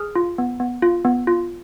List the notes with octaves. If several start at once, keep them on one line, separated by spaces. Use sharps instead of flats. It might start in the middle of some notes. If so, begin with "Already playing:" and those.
Already playing: G#4 F6
F4
B3
B3
F4
B3
F4